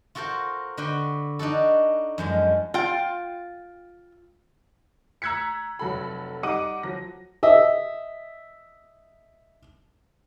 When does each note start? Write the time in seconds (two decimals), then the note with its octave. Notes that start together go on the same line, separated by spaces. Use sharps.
0.15 F4 F#4 A4 A#4 C5
0.77 D3 F#4 B4 G5
1.39 D4 D#4 F#4 A4
2.18 F#2 F3 G#3
2.74 F4 G5
5.22 A#5 E6 F#6 G#6 B6 C#7
5.79 F1 F#3 A4 B5
6.43 G3 D#4 F#5 D6 D#7
6.83 F3 F#3 A#6
7.43 D#5 E5